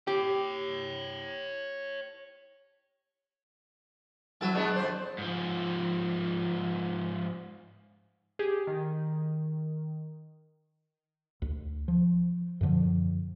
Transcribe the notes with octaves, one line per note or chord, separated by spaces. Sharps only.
G4 C#5 G5
F#3 E4 A4 A5
G#3 B3 D4
F2 C5
G#2 F3
G4 G#4
D#3
D2
F3
F#2 B2 D3 F3